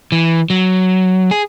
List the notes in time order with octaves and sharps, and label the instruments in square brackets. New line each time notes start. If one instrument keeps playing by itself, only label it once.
[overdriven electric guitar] E3
F#3
G#4